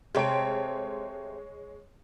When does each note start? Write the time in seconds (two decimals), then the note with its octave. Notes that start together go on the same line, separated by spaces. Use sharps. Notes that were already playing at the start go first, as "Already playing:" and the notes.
0.15 C3 G#3 A3 C4 C#5 D7